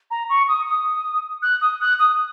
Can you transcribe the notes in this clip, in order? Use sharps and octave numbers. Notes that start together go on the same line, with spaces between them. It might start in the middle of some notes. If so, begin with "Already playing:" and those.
A#5
C#6
D#6
D#6
F#6
D#6
F#6
D#6